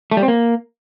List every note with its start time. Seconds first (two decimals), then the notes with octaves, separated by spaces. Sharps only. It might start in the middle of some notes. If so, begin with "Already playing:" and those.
0.11 A3
0.17 G3
0.23 C4
0.28 A#3